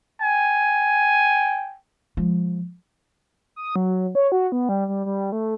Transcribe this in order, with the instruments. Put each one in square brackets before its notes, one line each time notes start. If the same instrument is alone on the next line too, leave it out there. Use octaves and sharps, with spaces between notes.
[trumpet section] G5 G#5
[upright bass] F3 G#3
[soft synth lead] D#6
F#3
C#5
F#4
B3
G3
G3
G3
A3